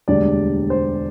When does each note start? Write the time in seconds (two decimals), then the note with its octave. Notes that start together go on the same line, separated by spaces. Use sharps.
0.08 E1 D2 D3 G3 D4 D5
0.70 C5